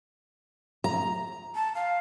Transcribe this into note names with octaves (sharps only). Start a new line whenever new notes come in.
A#5
A5
F5